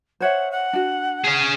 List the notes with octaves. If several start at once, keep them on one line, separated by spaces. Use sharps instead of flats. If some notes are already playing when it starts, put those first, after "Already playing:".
C5 C#5 E5 F#5
F#5
D4 F#4
C#4 G#4